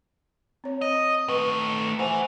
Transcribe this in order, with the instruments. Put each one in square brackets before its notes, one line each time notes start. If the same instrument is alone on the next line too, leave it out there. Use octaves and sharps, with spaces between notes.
[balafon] C4 C#5
[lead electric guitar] D#5
[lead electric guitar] D#3 A3 [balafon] B4
[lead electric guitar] E3 [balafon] C5 F#5 G#5